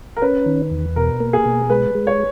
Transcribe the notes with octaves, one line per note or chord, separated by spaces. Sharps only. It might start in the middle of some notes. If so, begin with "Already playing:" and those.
A#4
C#4 B4
D#3
E2
B2 A#4
A#3
G#4
B2
G#3 B4
G#3
C#5